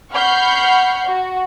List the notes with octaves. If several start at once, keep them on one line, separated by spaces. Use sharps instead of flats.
F#5 B5 C#6 F6 G6 C7
F#4